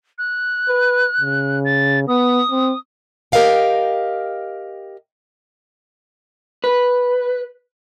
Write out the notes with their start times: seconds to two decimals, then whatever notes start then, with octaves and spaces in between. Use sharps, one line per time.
0.18 F#6
0.68 B4
1.21 C#3
1.65 A6
2.08 B3 D#6
2.51 C4
3.32 G4 A#4 C5 D#5 F5 G5
6.64 B4